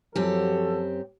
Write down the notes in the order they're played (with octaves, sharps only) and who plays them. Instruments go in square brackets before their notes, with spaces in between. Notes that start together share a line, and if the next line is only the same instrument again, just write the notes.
[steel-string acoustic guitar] F#2 C4 G4 [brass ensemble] F3 F#3 A4